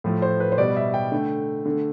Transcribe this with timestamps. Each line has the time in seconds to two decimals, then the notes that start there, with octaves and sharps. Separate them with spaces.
0.04 A2 F3 A3
0.22 C5
0.40 B4
0.52 C5
0.58 B2 G3 D5
0.77 E5
0.94 G5
1.12 D3 A3
1.66 D3 A3